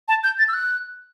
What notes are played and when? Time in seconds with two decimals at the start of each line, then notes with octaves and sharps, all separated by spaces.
0.08 A5
0.24 G6
0.39 A6
0.48 E6
0.54 F#6